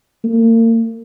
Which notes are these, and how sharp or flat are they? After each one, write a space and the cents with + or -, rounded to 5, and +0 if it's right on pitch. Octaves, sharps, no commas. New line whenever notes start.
A#3 -40